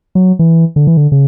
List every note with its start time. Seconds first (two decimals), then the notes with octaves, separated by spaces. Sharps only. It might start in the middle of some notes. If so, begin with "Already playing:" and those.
0.15 F#3
0.39 E3
0.76 D3
0.87 E3
0.97 D3
1.12 C#3